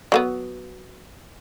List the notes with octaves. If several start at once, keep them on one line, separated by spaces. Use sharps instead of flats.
F#3 A#3 B3